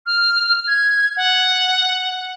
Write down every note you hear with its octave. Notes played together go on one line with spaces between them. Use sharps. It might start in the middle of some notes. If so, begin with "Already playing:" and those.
F6
G#6
F#5